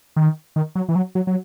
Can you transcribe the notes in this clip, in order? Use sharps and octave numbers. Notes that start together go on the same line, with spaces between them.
D#3
D#3
F#3
E3
F#3
F#3
F#3